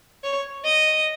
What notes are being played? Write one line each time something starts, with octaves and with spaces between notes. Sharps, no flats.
C#5
D#5